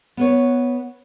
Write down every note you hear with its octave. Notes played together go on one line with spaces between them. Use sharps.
B3 B4 C#5